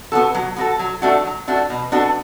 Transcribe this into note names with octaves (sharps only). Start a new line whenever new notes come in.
B3 F#4 A4
F#3
B3 F#4 A4
F#3
A3 D4 F#4
F#3
A3 D4 F#4
B2
B3 D4 F#4 A4